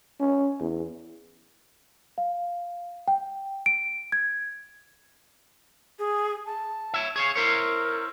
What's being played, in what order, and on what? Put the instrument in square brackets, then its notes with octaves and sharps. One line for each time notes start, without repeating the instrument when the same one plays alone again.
[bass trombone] C#4
E2
[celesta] F5
G5
D7
G#6
[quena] G#4
A5
[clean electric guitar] C#5 E5
[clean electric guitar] G#4 C#5 F5 [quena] C#6
[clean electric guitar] E4 C5 C#5 [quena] A#4